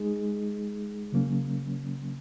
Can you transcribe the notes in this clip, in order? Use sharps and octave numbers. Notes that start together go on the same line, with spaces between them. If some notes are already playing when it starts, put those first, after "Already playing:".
Already playing: G#3 D#4 G#4
C#3 F#3 A#3 C#4